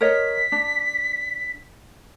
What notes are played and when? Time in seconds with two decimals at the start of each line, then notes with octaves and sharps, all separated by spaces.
0.01 A#4 C#5 D#5 B6
0.52 D4